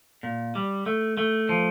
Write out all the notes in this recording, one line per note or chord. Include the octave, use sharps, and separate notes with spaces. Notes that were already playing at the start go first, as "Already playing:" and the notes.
A#2
G3
A3
A3
F3